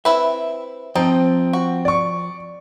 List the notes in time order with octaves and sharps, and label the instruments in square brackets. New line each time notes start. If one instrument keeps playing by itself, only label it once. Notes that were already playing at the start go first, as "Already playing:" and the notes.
[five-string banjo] C4 E4 B4 [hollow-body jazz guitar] E5
[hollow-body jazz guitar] F3 [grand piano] C4 G5 [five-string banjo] D#4
[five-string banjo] F#4
[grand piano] D5 C#6